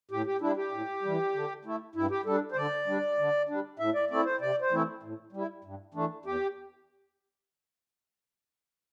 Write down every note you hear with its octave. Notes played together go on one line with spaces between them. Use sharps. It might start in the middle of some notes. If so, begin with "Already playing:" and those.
A2 G4
G4
G3 D4 E4
G4
A2
E3 G3
D3
A3 E4
G2 E4
G4
G3 D4 A4
C5
D3 D5
G3 D4
D3
G3 D4
A2 E5
D5
A3 C4 E4 D5
C5
C3 D5
C5
E3 A3 C4 E4
A2
G3 E4
G2
E3 A3 D4
E2 G4